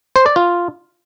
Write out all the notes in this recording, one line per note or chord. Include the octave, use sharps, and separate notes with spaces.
C5
D5
F4